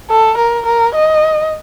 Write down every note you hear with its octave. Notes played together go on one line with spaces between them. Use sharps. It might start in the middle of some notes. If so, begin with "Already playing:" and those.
A4
A#4
A#4
D#5